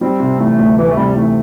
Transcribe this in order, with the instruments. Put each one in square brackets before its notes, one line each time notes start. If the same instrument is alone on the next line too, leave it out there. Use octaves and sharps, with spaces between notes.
[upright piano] G3 [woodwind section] C4
[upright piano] C3
[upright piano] E3 [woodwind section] A3
[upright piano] D2
[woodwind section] E3 [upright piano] G3
[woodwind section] A3
[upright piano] C3 [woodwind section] G3
[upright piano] E3 [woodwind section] A3